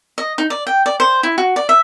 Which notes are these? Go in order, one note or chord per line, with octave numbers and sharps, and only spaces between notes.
D#5
D#4
D5
G5
D5
C5
E4
F#4
D5
E5